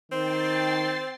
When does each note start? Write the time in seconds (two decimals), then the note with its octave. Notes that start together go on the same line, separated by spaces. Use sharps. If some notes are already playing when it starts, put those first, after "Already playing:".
0.12 D#3 C4 G5 A6 C7